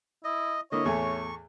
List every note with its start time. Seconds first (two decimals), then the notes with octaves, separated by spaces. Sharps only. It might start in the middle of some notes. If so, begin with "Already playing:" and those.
0.24 E4 D#5
0.72 D3 A#3 E4 C#5 D#5
0.85 E2 A2 G#5 C#6